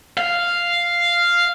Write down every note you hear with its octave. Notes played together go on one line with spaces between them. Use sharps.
F5